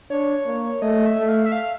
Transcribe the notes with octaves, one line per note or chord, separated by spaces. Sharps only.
D4 C#5
A#3
A3 D#5
E5
A3
F5
E5
F5